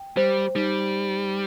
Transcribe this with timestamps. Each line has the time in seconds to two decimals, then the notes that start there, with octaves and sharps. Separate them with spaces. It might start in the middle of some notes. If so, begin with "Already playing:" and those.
Already playing: G5
0.17 G3 C5
0.55 G3 D#4